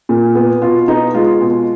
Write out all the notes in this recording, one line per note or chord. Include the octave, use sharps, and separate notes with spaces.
A#2
B3
B2 F4
B3 D#4
G#3 F4
B2